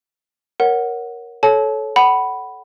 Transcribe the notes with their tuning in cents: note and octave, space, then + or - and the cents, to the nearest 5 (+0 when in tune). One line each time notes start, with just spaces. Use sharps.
A#4 +15 C#5 +0 F#5 +0
A4 -20 C#5 +0 A5 -35
F#5 +25 B5 +0